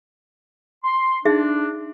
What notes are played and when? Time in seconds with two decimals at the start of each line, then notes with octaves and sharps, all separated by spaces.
0.84 C6
1.25 D4 D#4 G#4 E5